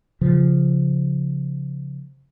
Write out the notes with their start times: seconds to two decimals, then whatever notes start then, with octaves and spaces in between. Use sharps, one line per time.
0.21 C#3 F3